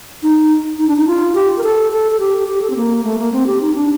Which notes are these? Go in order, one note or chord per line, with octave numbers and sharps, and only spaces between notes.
D#4
D#4
D4
D#4
F4
G4
A#4
A4
A4
A4
G4
G4
A4
C4
A#3
A3
A#3
C4
G4
D#4
D4